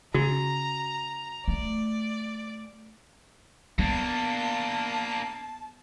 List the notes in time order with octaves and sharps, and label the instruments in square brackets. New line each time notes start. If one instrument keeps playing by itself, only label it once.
[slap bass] C#3 [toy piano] F#4 [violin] A#5
[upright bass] A3 [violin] D5
[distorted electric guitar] A#3 D4 [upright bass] B3 [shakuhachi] A5